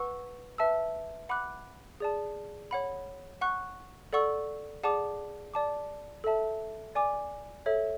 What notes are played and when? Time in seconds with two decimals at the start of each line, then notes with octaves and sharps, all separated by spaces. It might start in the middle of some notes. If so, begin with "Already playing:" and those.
Already playing: B4 F#5 C#6 E6
0.58 B4 E5 A5 E6
1.29 F#5 B5 D6 F#6
2.00 G#4 D5 A5
2.71 C#5 F#5 B5
3.41 F#5 C#6 F#6
4.13 A4 D5 F#5 C#6 E6
4.84 G#4 D5 F#5 A5 D6
5.54 D5 A5 D6
6.24 A4 E5 A5
6.95 D5 G#5 D6
7.66 A4 C#5 E5